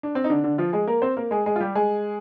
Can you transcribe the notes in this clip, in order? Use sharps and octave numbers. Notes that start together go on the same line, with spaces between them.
D4
C4
D#4
D3 D4
D3 D4
F3 F4
G#3 G#4
A#3 A#4
C4 C5
A#3 A#4
G#3 G#4
G#3 G#4
F4
G3 G4
G#3 G#4